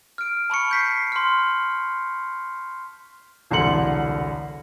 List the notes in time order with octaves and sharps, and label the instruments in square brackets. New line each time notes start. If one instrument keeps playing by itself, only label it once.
[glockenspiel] F6 D7
A5 B5 C#6 C#7
G6 B6 C7
C6 F6
[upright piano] E1 C2 D3 C6 C#7 F#7